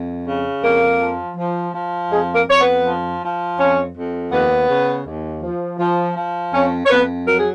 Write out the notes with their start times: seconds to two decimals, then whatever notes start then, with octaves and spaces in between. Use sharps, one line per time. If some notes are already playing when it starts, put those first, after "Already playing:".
Already playing: F2
0.26 C#3
0.63 F2 A#3 A#4
0.99 F3
1.37 F3
1.74 F3
2.10 F2 G#3 G#4
2.34 A#3 A#4
2.48 F2 C#5
2.59 B3 B4
2.83 F3
3.21 F3
3.57 F2 C#4 C#5
3.95 F2
4.31 D#2 B3 B4
4.68 C#3
5.05 D#2
5.42 F3
5.78 F3
6.15 F3
6.52 F2 C#4 C#5
6.84 C#5
6.89 F2 B3 B4
7.26 F#3 A#4
7.37 G#4